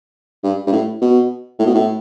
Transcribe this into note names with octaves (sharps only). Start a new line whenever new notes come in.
G2
G2
A2
B2
A2
B2
A2